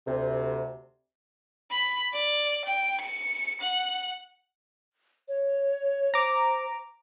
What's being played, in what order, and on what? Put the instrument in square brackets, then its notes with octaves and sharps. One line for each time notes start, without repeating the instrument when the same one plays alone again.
[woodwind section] D2 C3
[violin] B5
D5
G5
C#7
F#5
[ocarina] C#5
[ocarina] C5 [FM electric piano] A#5 D6